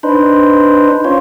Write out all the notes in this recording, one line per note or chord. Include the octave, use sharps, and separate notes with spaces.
D4 D#4 B4 C5
C#4 F4 C5 C#5